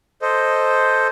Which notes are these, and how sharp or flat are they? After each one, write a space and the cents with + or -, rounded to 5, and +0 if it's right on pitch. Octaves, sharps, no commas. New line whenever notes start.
A4 +0 C5 +0 D#5 +0